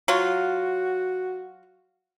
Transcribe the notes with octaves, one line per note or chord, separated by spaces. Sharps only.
F#3 F4 F#4